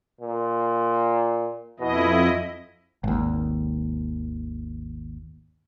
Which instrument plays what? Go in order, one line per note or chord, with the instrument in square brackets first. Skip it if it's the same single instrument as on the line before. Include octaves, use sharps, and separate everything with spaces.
[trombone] A#2
[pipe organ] F2 E4 D#5 [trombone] B2
[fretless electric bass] G#1 D#2